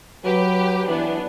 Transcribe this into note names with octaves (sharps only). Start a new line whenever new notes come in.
F#3 G4 B4
E3 B3 D4